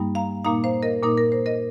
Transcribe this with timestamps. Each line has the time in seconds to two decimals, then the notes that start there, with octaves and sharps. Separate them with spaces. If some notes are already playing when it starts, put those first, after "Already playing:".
Already playing: G2 G3 A#3 D#4
0.15 F5 A#5
0.44 A#2 A#3 D#4 F5 A#5
0.64 C5 F5
0.83 A#4 D#5
1.02 A#2 A#3 D#4 A#4
1.18 A#4
1.32 C5
1.46 A#4 D#5